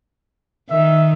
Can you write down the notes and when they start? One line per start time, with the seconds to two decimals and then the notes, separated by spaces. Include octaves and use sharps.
0.70 D#3 E5